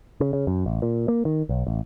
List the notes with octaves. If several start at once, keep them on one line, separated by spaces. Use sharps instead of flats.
C#3
C#3
F#2
A1
A#2
A#3
D#3
B1
A1